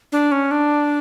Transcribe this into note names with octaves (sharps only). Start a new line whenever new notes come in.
D4
C#4
D4